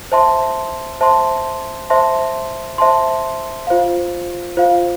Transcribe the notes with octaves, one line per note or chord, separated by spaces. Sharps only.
C5 E5 A5 C6
C5 E5 A5 C6
C5 E5 A5 C6
C5 E5 A5 C6
F4 C5 F5
F4 C5 F5